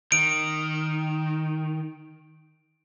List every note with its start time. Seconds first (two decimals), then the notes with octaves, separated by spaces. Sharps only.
0.12 D#3 D7